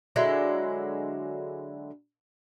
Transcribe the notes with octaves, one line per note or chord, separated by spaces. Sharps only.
D3 F#3 G#3 E4